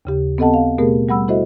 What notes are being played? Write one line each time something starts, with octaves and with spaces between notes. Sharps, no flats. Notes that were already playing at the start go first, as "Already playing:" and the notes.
D#2 C#3 G4
B3 C4 A4 D#5 F#5 A5
F5
B2 A3 B3 G4 G#4 A#4
G3 F#5 B5 E6
E4 F#4 A4 C5 D#5 E5